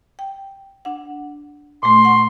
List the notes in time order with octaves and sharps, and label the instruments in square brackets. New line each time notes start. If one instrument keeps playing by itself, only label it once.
[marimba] G5
D4 F#5
[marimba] A#2 A3 [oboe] C6
[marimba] F#5 C#6